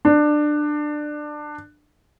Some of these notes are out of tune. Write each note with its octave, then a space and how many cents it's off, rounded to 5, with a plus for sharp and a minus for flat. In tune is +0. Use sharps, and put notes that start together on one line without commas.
D4 +20